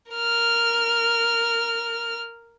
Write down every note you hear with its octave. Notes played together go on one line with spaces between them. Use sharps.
A#4 F6